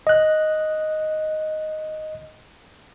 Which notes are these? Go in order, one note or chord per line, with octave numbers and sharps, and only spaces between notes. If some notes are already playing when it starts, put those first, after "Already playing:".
D#5 F#6